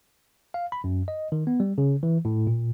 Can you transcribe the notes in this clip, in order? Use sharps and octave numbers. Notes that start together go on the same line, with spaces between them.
F5
B5
F#2
D#5
D#3
B3
G3
C#3
E3
A2
A#2